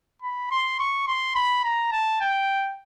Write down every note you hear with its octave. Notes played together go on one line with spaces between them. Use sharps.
B5
C6
C#6
C6
B5
A#5
A5
G5